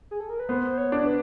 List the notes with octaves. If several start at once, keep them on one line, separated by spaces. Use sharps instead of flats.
G#4
A4
A#4
B4
B3 C5
C#5
D4
B4